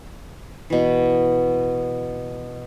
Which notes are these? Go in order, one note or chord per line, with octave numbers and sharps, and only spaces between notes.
B2 E3